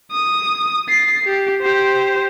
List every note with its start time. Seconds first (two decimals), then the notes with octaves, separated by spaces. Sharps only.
0.12 D#6
0.89 A6 C7
1.25 G4
1.61 G4 C5